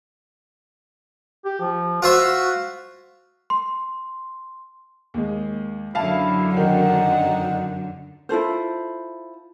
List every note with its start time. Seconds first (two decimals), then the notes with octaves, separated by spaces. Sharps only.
1.45 G4
1.61 F3
2.02 F4 F#4 C5 E5
3.50 C6
5.14 D#2 G#3
5.95 F#2 D3 E4 F5 A5
6.57 D#3 D#4 F#5
8.29 E4 F4 A4 C5